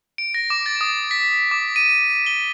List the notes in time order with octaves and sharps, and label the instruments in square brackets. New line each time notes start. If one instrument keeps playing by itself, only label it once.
[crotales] D7
A#6
D6
A6
D#6
B6
D6
D#7
G7